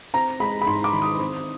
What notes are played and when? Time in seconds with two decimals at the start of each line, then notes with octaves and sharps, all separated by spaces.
0.14 C4 A#5
0.40 G#3 B5
0.61 B5
0.66 G#2 C6
0.84 D6
0.93 D#3
1.02 D#6
1.20 C4